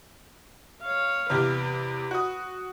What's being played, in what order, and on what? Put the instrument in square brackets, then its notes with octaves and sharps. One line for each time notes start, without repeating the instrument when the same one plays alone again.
[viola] C#5 F5
[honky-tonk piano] E2 C3 G4 [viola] B4
[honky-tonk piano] F#4 D#6